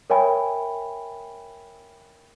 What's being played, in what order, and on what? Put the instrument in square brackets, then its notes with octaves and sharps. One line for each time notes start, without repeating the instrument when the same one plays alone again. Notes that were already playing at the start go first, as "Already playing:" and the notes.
[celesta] A#4 C#5 E5 G5 G#5 B5